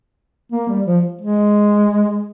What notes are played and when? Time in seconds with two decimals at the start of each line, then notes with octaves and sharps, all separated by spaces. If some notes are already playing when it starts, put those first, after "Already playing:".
0.52 A#3
0.69 G3
0.86 F3
1.22 G#3